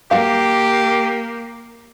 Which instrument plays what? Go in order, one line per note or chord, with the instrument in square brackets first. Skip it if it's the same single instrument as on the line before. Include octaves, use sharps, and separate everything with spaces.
[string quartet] A#3 [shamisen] F#4 F5 [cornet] G4